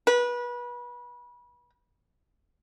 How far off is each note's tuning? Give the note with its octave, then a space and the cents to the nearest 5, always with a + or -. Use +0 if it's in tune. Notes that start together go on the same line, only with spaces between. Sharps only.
B4 -30